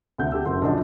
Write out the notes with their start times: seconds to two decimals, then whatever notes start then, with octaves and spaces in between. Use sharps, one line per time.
0.18 D2 C3 F#5 G6
0.32 G4 A4 E6
0.46 F#1 F#4 A#4 C6
0.62 A#1 F#2 C#3 D4 F#4 D#5